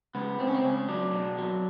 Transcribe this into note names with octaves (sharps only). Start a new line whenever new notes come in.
C#2 B3
C#2 C4
C#4
C4
C#2 C#4
F#3 D4
B2
F#3